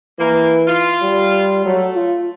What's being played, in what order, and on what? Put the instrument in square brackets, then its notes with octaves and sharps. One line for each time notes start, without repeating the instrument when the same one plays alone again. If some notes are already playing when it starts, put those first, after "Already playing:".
[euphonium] E3 [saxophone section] A#3
[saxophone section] F4
[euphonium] G3
[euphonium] F#3 [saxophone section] A3
[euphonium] F4